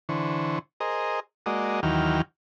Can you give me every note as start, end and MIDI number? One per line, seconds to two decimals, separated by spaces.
0.09 0.59 50
0.09 0.59 52
0.09 0.59 72
0.09 0.59 85
0.80 1.20 68
0.80 1.20 70
0.80 1.20 72
0.80 1.20 75
1.46 1.80 56
1.46 1.80 58
1.46 1.80 66
1.46 1.80 74
1.46 1.80 75
1.83 2.22 39
1.83 2.22 51
1.83 2.22 52
1.83 2.22 54
1.83 2.22 79
1.83 2.22 89